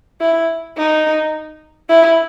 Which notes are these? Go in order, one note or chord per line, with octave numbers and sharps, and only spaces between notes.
E4
D#4
E4